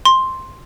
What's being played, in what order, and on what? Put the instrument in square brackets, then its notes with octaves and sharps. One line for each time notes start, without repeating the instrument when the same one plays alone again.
[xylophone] C6